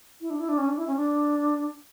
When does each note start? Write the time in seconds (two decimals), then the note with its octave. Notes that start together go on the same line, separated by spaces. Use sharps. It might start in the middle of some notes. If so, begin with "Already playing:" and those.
0.21 E4
0.30 D4
0.40 E4
0.49 D4
0.58 C#4
0.68 D4
0.78 E4
0.87 C#4
0.96 D4